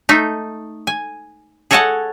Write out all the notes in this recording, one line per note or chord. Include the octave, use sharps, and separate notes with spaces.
A3 D#4
G#5
G#4 A4 C#5 D#5 F#5 A5